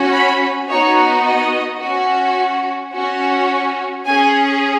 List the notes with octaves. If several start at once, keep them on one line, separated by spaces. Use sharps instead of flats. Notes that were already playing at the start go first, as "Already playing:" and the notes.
Already playing: C#4 F#4
B5
B3 D#4 F#4 C#5
D#5
C#4 F#4
C#4 F#4
C#4 G#4 G#5